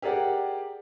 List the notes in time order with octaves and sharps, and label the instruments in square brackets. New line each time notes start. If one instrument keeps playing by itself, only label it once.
[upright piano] G4 G#4 A#4 D5 F#5